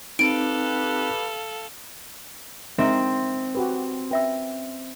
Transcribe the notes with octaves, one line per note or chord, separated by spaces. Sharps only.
C4 D#4 G4 A4 B4 F5 D7
G#3 C4 D#4 A#4 E5
F#4 G4 B4
C#4 B4 E5 E6